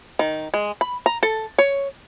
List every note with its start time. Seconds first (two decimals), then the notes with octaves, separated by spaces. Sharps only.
0.19 D#3
0.54 G#3
0.81 B5
1.06 A#5
1.23 A4
1.58 C#5